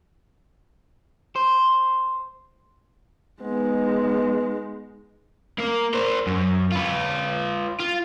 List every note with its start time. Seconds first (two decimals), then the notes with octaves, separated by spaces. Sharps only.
1.36 C5
3.41 G#3 B3 D#4
5.60 A#3
5.94 A#4 C5
6.27 F#2
6.72 F4 B4
7.80 F4